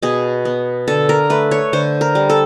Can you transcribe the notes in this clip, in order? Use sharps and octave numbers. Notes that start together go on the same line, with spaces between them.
B2 G#4
B3
D3 A4
A#4
A3 B4
C#5
D3 C5
A#4
G3
A4